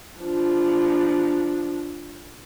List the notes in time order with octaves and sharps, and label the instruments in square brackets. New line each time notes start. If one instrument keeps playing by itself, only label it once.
[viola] F3 D4